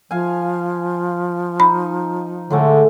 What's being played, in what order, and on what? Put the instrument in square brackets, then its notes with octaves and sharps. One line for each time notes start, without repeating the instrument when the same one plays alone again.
[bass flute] F3 [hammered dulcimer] F5 G#5
[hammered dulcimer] D#4 [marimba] B5
[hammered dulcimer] A2 G#3 A3 [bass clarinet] D3